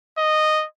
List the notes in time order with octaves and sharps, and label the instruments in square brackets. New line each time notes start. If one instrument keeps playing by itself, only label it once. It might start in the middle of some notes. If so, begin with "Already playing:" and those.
[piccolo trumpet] D#5